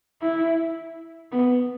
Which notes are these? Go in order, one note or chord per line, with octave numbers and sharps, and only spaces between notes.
E4
B3